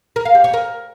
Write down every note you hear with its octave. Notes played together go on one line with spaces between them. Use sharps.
A#4
F5
G4
C#5
A#4